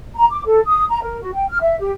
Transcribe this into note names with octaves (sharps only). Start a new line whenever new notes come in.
A#5
D6
A4
D#6
A#5
A#4
F#4
G5
F6
E5
G4